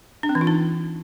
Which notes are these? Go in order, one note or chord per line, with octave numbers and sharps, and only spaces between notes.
D4
C4
E3
F4
D#4